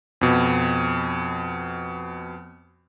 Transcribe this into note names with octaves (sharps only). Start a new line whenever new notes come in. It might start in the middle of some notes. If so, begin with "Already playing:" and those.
F2 B2